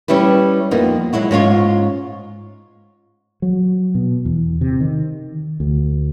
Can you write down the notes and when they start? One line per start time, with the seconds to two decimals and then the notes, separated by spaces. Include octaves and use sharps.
0.08 G3 C#4 E4 G4 B4
0.71 F2 A#3 B3 D#4
1.13 F#3 G#3 E4 F#4
1.31 G#2 C#4 F4 C#5
3.42 F#3
3.95 B2
4.25 E2
4.61 C3
4.80 D#3
5.60 D2